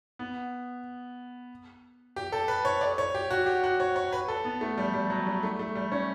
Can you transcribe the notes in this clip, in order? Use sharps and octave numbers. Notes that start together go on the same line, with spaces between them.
B3
G4
A4
B4
C#5
D5
C#5
G4
F#4
G4
F#4
C#5
C#5
B4
A4
B3
A3
G3
G3
F#3
G3
A3
A3
G3
C#4